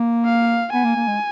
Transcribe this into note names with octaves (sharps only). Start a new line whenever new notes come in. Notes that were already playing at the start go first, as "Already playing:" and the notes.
Already playing: A#3
F5
B3 G#5
A#3
A#3
G#3